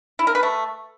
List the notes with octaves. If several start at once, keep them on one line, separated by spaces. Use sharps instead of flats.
E4
A#4
B4
A3